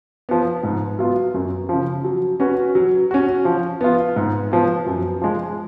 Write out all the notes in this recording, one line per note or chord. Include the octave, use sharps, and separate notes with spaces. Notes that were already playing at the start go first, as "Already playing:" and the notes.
F3 B3
G#2
F#3 B3 F4
F#2
C#3 F3
F#3
C#4 F#4 B4
F#3
C#4 F#4
F3
B3 F4
G#2
F3 B3
F#2
F3 G#3